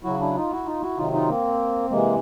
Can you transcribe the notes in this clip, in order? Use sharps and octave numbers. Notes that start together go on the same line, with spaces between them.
C#3 F#3 E4 F#4
D4 E4
D#4 F4
E4 F#4
D#4 F4
E4 F#4
C3 D#3 F#3 D#4 F4
D#4 F4
A#3 C4
C3 E3 G#3 A#3